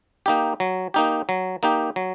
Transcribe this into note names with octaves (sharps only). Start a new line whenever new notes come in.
A#3 D#4 G4
F#3
A#3 D#4 G4
F#3
A#3 D#4 G4
F#3